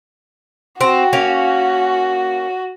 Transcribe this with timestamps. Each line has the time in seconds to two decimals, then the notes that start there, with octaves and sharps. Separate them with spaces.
0.81 C4 F#4
1.13 A#3 C#4